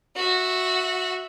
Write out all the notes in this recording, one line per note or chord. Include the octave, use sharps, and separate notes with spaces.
F#4 E5